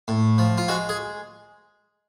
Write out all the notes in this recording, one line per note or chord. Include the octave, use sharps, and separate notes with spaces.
A2
F3
F4
G#3 F#4
G#4